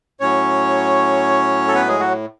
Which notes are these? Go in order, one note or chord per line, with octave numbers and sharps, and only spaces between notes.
A2 F#3 C#4 C#5
A4
B3 B4
G#3 G#4
F#3 F#4